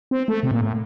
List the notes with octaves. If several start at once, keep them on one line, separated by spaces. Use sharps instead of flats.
C4
A3
C3
A#2
A2